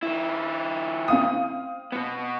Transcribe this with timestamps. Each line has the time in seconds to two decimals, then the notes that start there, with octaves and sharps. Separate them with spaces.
0.03 D#3 E4
1.08 C4 F5 D#6
1.92 B2 B3